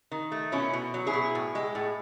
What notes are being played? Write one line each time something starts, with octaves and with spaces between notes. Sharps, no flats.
D#3
A3
B2 C#4 E4
B2
F#3
E4 G#4
B2
A2
G#3
A2